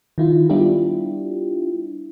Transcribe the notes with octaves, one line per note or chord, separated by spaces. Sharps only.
D#3 E4 F4
G3 B3 D4 E4 F4 G4